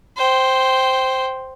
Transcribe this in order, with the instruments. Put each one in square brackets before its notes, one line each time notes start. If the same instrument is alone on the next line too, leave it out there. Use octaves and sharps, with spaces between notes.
[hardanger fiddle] C5 G5